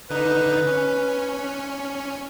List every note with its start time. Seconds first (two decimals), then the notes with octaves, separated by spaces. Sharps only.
0.10 D3 D#4 B4
0.67 C#4